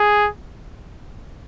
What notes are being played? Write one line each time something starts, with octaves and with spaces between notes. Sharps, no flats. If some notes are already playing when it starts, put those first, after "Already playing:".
Already playing: G#4